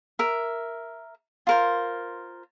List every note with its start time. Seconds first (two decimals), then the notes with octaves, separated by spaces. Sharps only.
0.19 A#4 E5
1.47 F4 A#4 C5